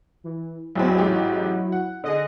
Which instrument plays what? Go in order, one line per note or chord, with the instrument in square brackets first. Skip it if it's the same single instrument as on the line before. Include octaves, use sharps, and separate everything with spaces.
[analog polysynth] E3
[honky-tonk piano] A1 E2 C4 [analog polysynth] F#3 E4 F#4
[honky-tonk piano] A1 G#2 G4
F#5
[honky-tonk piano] D3 [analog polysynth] G#4 D#5